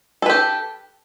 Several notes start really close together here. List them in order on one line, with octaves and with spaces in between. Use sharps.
A4 B4 G4